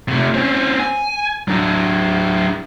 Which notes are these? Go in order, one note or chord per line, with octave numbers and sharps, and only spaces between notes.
C3 A3
C4 C#4
G#5
F#3 D4